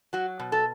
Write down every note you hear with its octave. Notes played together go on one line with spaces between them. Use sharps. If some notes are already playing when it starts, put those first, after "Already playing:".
F#3 F#4
B2
A4